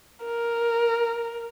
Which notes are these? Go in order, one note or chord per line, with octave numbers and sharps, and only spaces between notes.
A#4